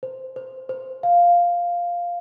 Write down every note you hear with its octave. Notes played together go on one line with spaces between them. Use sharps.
C5
C5
C5
F5